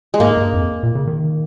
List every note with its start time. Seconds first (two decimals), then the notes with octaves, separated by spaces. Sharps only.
0.14 G#3
0.20 G#2 A#3
0.37 G2
0.54 F2
0.83 A#2
0.95 C#3
1.07 D#3